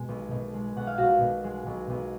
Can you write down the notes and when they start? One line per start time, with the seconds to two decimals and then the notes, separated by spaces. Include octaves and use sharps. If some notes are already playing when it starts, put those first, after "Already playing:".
Already playing: B2 G#3
0.09 B1
0.31 B2
0.54 G#3
0.76 B1 F#5
0.87 F5
0.98 B1 F#4 F#5
1.21 B2
1.44 G#3
1.67 B1
1.90 B1